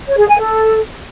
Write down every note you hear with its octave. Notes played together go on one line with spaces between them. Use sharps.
C#5
G#4
G#5
A4